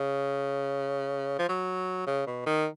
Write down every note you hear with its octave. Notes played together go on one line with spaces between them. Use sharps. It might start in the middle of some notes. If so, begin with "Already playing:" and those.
Already playing: C#3
F3
F#3
C#3
B2
D#3